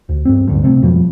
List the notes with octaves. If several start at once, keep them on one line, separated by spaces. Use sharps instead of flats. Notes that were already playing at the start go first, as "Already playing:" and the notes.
D2
G2 C4
A1 D2 G2
C3 A3 C4
F2 B2 F3 G3